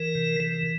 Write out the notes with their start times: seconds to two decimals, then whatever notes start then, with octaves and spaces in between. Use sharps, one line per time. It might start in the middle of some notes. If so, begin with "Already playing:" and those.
Already playing: E3 A#4
0.15 C3
0.40 E3